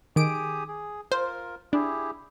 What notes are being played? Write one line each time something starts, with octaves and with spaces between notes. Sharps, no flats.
D#3 G4 G#4 D#6 D7
G#4
F4 A#4 C5
D4 E4 G4 G#4